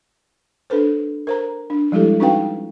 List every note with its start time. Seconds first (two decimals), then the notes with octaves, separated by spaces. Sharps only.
0.70 D4 A4 B4 C5
1.27 A#4 C5 A#5
1.70 D4
1.92 F3 G3 G#3 E4 G4 A4
2.20 C#4 D#4 F#4 B4 F5 G5